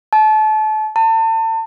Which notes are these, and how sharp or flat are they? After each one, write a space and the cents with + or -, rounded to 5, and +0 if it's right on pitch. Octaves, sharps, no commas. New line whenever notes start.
A5 -30
A5 +35